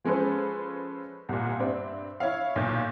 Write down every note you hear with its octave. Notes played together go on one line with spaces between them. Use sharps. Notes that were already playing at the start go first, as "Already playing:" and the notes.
F3 G#3 C#4 A4 B4 C5
C2 A#2
G2 C4 D4 E5
E4 C#5 E5 F5
B1 A#2 G6